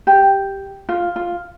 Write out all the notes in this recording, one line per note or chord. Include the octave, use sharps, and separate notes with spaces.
G4
F4
F4